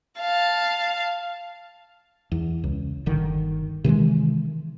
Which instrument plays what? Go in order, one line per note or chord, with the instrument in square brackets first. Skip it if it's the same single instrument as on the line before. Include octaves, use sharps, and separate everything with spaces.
[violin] F5 A5
[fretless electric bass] E2
C#2
G1 D3 D#3
C3 D#3 E3 G#3